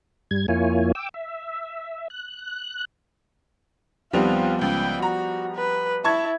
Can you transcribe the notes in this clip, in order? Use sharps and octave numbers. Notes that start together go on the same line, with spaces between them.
G2 G3 G#6
F2 A#3 E4 F4 C#5 G#5
G5 D6 E6
E5
F#6
D#2 F3 G3 B3 C4 F4 F7
C#2 G5
F#4 A#5
B4
E4 A5 C#6 G#6